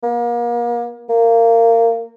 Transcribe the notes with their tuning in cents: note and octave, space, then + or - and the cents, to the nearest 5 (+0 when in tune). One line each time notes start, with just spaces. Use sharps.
A#3 +35
A#3 -20